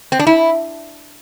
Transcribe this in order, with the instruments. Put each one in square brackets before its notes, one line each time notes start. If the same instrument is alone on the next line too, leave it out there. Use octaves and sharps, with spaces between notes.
[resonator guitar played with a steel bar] C4
D4
E4